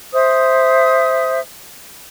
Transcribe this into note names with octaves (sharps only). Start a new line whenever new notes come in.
C5 E5 D#6